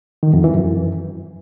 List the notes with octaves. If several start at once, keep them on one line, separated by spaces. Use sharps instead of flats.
D#3
F2
E3
F#2